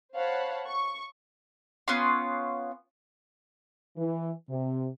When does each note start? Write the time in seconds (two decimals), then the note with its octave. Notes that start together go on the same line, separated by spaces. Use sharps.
0.14 C5 C#5 F5 F#5 A5 B5
0.66 C#6
1.88 B3 C#4 F4 C6
3.97 E3
4.49 C3